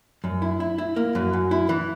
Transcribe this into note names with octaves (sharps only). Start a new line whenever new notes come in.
F#2
E4
E4
E4
A#3
F#2
F#2
E4
E3